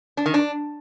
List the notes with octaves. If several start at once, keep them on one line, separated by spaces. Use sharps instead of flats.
D4
D#3
D4